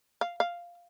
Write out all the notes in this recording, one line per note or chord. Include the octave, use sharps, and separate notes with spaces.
F5
F5